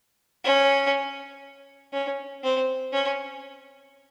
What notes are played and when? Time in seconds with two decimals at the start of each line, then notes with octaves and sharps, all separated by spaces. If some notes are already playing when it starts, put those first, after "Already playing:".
0.44 C#4
1.93 C#4
2.43 C4
2.92 C#4